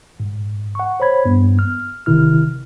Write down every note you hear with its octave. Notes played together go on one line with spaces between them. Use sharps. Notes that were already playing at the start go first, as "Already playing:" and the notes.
G#2
F#5 C#6
C5 C#5 B5 G#6
G2 B3
F6
G#1 C3 D#3 E4 F6